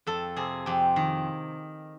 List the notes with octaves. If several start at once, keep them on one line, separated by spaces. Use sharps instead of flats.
F2 A4
C3 G#4
F2 G4
D#3